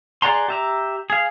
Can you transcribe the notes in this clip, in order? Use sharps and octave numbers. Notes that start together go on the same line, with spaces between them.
G#4 D5 F#5 A#5 C6
G4 E5 A#5
G#4 F5